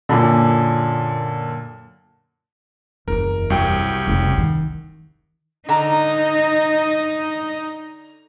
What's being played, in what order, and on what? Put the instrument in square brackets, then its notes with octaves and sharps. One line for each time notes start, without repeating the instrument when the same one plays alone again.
[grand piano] F#2 A#2 D3
[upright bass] F#1 E2 [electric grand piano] A#4
[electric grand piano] C2 F#3 G5
[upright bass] F1 C#3
D#3
[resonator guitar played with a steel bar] D3 A#5 [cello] D#4